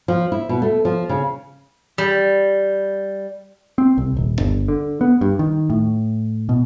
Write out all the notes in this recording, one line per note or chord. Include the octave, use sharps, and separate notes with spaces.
F3
E4
B2
A3
F3
C#3
G3
C4
C2
D#1
G1
D3
B3
G2
D#3
A2
B2